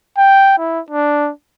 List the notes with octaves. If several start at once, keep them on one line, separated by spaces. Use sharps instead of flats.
G5
E4
D4